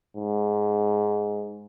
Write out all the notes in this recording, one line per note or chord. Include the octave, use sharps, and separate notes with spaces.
G#2